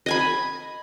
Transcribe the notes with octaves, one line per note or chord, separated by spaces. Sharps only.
D#5 G#5 B5